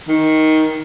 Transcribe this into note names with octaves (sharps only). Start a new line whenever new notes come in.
D#3